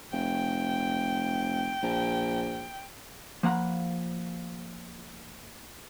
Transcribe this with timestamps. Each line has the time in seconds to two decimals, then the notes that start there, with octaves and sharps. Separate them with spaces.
0.12 F1 G5
1.83 A#1
3.43 F3 A#3 F#5 A#5 B5